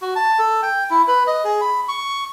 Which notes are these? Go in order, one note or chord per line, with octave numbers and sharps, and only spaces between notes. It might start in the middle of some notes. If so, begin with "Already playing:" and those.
F#4
A5
A4
G5
E4
B4
D#5
G#4
B5
C#6